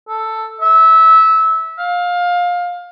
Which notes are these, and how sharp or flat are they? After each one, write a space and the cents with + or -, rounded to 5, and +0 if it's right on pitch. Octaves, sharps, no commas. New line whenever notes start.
A4 +5
E5 -20
F5 +20